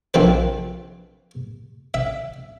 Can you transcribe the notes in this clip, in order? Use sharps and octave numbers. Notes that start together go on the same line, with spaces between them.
A#1 A#3 C4 B4
E5